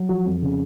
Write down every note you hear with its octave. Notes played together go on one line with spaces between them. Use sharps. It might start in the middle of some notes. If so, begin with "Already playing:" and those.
Already playing: F#3
F3 F#4
F2
C#3